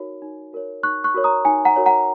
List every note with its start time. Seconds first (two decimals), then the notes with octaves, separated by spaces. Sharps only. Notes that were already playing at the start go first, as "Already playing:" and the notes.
Already playing: D#4 F#4 A#4 C#5
0.22 D#4
0.53 F#4 A#4 C#5
0.83 D#4 C#6 F#6
1.04 C#6 F#6
1.14 F#4 A#4 C#5
1.24 A#5 D#6
1.45 D#4 G#5
1.65 F#5 A#5
1.76 F#4 A#4 C#5
1.86 F#5 A#5